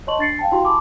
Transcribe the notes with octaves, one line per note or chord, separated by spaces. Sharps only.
C#5 D#5 A5 C6 C#6 F#7
D4 A6 C7 C#7
F5 G5 A5
E4 F#4 G4 F5 G5 C6
G#5 A5 B5 C6 D6